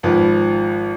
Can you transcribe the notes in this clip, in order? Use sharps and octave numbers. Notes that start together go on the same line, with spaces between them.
G#1 F3 B4